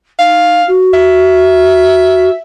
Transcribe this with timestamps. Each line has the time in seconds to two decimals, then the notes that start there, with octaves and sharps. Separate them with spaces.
0.19 D#4 F5
0.67 F#4
0.94 E5